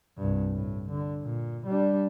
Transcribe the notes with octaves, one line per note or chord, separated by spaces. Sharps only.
C2 G2
A2
D3
A#2
G3 D4